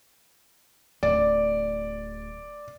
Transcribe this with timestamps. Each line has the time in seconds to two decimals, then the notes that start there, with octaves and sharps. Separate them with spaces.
1.03 D1 D5